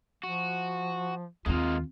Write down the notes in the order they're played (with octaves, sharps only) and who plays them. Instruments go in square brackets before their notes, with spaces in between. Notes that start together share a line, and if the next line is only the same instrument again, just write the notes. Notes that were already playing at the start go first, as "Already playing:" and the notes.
[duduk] F3 [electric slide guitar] F#4
[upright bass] D#2 D#3 [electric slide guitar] G#3 A#3 D#4 [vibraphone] C4 [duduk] F4